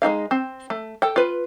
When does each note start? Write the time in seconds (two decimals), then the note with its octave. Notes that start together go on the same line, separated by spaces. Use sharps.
0.02 G#3 C4 D#4 F5
0.31 C4
0.70 A3
1.02 A4 G5
1.16 F4 B4